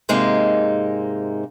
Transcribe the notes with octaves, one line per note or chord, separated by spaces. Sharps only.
G#2 C3 G#3 A#3 D#4